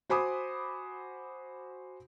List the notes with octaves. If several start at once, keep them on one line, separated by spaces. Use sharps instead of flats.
F#4 C5 G#5 B5 D6 D#6